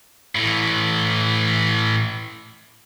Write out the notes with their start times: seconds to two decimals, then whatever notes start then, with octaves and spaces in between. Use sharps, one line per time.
0.35 A2 E3